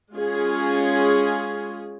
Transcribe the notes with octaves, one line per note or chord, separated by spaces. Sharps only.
G#3 C#4 F4 G#4